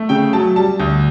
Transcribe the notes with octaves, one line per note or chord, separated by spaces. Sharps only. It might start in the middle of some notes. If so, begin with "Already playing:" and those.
Already playing: A3
C#3 G5
F#3 A5
G3 A5
D2